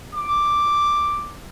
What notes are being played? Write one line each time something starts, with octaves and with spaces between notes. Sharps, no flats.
D6